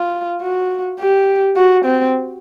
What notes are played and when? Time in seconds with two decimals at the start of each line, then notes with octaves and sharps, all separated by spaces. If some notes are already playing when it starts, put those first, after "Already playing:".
Already playing: F4
0.42 F#4
1.00 G4
1.56 F#4
1.85 C4